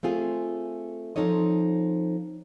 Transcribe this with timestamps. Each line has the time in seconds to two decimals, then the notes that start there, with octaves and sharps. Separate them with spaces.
0.03 A3 C4 F4 G#4
1.16 F3 C4 D#4 A4 C#5 D#5